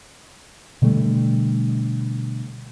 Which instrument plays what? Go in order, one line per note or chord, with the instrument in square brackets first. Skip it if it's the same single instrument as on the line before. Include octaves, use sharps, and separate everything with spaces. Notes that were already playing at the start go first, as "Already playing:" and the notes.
[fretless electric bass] B2 D3 G3 A3